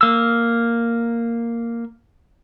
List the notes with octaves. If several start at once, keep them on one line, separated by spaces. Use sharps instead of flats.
A#3 E6